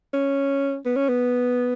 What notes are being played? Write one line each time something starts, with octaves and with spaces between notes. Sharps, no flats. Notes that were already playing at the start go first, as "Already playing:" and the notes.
C#4
B3
C#4
B3